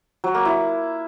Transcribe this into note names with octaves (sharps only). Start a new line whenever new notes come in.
F#3
A#3
E4